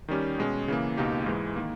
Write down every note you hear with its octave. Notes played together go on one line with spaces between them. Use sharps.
D#3 G3 C#4 G4
B2 G#3 C#4
C#3 E3 A#3
C#2 B2 A#3 D#4 G4
G#2 E3 G#3
D#3 A#3